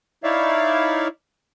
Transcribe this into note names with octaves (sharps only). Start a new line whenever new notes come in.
D#4 E4 C#5 D5 E5 F5